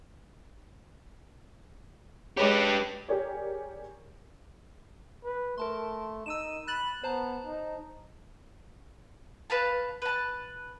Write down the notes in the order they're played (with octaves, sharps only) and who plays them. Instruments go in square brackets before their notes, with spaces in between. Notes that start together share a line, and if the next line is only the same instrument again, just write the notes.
[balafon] G#3 G#4 C#5 [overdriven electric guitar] G4 B4
[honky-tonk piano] G4 G#4 A#4 C#5 D5
[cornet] B4
[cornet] A3 [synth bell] A#4 A5 C6
[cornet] D#4 [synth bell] E6 D#7 E7
[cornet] B5 [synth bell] F#6 A6 F#7
[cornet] B3 [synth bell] C5 A5 A#5
[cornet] D#4
[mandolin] B4 F5 A5
B4 A5